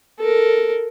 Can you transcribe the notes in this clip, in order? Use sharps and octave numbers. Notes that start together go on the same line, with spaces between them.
A4 A#4